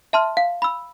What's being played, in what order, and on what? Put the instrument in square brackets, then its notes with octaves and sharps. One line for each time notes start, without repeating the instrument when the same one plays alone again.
[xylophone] E5 A5 C6 F6
F5
B5 E6